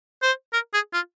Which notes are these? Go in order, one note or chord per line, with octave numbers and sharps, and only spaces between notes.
C5
A#4
G#4
F4